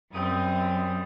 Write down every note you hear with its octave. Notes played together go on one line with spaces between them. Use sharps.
F#2 G3 C4 D#6